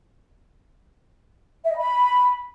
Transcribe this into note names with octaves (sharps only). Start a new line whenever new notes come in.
E5
D#5
B5